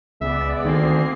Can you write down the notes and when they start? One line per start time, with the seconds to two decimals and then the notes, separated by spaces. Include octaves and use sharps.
0.21 C#2 G#3 B3 D5 E5
0.65 D2 D#3 A#3 C4 G#4 C7